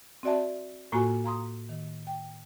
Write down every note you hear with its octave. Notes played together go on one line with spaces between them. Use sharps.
C4 F#4 D5 E5 A5
A2 A#3 F4 F#4 G#5
F5 A#5 C6 D#6
D#3
G5